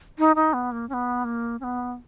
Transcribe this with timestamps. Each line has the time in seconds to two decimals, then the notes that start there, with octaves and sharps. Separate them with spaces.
0.18 D#4
0.36 D#4
0.53 B3
0.72 A#3
0.89 C#4
0.94 B3
1.25 A#3
1.60 C#4
1.64 B3